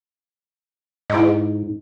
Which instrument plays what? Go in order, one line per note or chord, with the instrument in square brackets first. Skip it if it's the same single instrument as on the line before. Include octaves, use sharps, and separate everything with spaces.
[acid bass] G#2 [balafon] E4 D#5